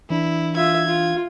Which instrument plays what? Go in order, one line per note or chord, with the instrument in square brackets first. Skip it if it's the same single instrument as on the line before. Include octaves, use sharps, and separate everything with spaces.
[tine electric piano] E3 D4 [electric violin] E4
[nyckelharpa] F4 E5 [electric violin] G#6
[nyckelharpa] F4